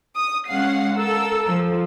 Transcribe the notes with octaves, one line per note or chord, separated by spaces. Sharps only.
D#6
G#3 C#4 F5 F#5 C7
A4 A#4 E6
F3